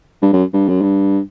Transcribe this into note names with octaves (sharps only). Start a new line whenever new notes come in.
G2
F#2
G2
F#2
G2